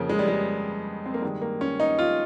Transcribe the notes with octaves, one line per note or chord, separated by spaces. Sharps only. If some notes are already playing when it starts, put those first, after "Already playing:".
Already playing: F2 C#3 A#3
G#3
G3
G#3
C4
A#3
G2 D#3 G#3
A#3
C#4
D#4
F4